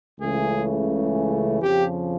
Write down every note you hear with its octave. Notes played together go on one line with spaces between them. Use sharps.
C#2 C#3 E3 A3 G#4
F2 C#3 F3 G4